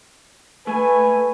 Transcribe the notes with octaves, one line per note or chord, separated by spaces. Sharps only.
A3 B4 G#5